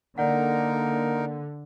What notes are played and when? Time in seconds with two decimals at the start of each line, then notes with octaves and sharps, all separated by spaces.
0.18 D3 A#3 D#4 A#4 D5 F#5